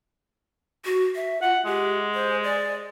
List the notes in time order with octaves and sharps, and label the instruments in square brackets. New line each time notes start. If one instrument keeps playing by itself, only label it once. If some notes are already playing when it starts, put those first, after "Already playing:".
[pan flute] F#4
E5
[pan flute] F4 [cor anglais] F#5
[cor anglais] G#3 [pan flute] G4
[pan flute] C5
D5